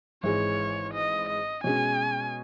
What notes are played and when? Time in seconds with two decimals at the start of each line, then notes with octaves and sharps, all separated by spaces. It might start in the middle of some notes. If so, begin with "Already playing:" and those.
0.23 G#1 G#2 E3 G#3 C#5
0.94 D#5
1.29 D#5
1.64 B2 G#3 C#4 G#5